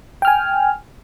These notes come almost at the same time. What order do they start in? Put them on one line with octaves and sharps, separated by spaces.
G5 F6 G#5